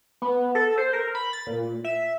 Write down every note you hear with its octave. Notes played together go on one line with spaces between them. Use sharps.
B3
A4
C5
A#4
B5
A6
A#2
E5